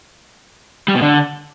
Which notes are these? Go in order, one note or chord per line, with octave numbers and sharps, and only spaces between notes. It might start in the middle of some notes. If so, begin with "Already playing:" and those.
G3
B2
D3